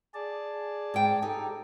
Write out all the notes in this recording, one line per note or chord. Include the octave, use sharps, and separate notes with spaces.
G#4 D5 A5
G#2 G5
D#4 G4 A4